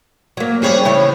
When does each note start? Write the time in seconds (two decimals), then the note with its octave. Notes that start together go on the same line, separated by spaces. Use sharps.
0.37 F#3 A#3
0.62 F3 G3 C#4 D4 G#4 C#5
0.85 E2 A2 C#3 E4 C#5